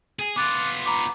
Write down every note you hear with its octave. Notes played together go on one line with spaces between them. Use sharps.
G#4
B3 F4 D6 F#6 A6
A#5 B5 D6